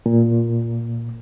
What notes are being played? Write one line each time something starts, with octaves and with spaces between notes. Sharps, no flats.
A#2